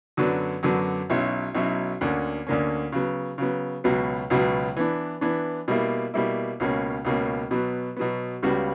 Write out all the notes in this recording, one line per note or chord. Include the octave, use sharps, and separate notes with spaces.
F#2 D3 F#3 B3 D4
F#2 D3 F#3 B3 D4
B1 B2 F#3 C#4 E4
B1 B2 F#3 C#4 E4
D2 D3 A#3 C#4
D2 D3 A#3 C#4
C#3 F#3 B3
C#3 F#3 B3
C#2 B2 F#3 B3
C#2 B2 F#3 B3
E3 B3 D4
E3 B3 D4
B2 G3 A#3 E4
B2 G3 A#3 E4
C#2 B2 A#3 C#4
C#2 B2 A#3 C#4
B2 F#3 B3
B2 F#3 B3
C#2 C#3 G3 B3 F#4